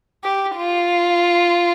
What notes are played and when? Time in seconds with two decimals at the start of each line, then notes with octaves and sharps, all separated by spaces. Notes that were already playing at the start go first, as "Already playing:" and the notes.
0.24 G4
0.56 F4